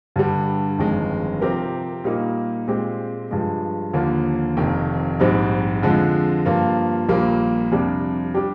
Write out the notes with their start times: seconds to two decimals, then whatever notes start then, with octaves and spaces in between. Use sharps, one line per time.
0.16 G2 D3 G3
0.79 G1 F2 D#3 G#3
1.41 C3 F3 C4 G4 A#4
2.04 A#2 G3 A#3 D#4
2.68 A#2 G#3 C4 G4
3.31 G2 F3 G#3
3.94 D#2 D3 F3 A#3
4.57 F1 F2 D#3
5.20 A#1 G#2 G3 C4 D#4
5.82 F2 D3 F3 G#3
6.46 G2 F3 A#3 F4
7.09 A#1 A#2 G3 A#3
7.72 F2 C3 G3 D4
8.34 G3 D4 G4